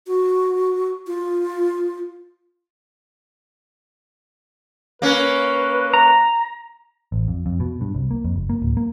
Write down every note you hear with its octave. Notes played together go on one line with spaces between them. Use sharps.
F#4
F4
A#3 C#4 B4
A#5
A1
F2
F2
B2
G2
C2
A#3
F2
F#1
A#3
D1
A#3